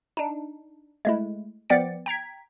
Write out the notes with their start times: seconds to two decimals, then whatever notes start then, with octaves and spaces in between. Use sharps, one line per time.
0.17 D4 D#4
1.05 G#3 A3 E4
1.70 F3 B3 D5 G5 A6 C#7
2.06 G5 A#5 G#6 B6